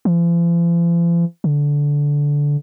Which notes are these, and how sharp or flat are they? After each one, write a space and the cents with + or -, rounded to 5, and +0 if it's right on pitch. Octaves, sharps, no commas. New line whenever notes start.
F3 -45
D3 -15